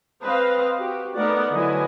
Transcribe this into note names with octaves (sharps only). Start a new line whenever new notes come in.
C4 B4 C5 D#5 F5
F#4 G4
A3 B3 D#4 A#4 D5 F#5
D3 F#3 E4 B4 D#5 G#5